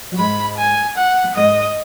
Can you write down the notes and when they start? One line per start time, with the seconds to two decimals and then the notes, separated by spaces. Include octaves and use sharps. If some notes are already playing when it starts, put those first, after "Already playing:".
0.12 F#3
0.18 G#2 G#3 B5
0.58 G#5
0.97 F#5
1.24 B3
1.35 G#2 G#3 D#5